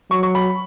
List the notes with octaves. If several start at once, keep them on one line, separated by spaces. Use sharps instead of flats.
F#3 C#6
C#6
B5